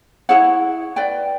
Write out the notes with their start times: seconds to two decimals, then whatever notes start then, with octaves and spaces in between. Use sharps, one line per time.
0.29 E4 G#4 C#5 F#5
0.96 B4 D5 G5